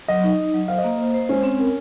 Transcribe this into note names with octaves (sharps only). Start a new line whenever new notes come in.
F#3 D#5
D#4
D#4
F#3
C5 F5
D#5
A#3
C5
C5
G#3 C#4
C4
A#4